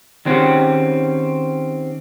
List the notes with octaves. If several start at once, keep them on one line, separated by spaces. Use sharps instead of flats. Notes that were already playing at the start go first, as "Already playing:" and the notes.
D#3 F#3 C4 C#4 F#4 G4